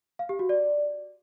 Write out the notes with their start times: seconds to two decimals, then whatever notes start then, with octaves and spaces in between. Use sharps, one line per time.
0.19 F5
0.29 G4
0.39 F#4
0.49 D5